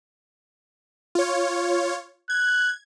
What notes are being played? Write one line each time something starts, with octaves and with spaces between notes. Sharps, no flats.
F4 C#5
F#6 G#6